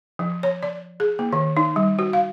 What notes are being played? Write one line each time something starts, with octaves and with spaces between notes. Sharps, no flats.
F3
C#5
D5
G#4
A#3
D#3
D#4
G3
F#4
F5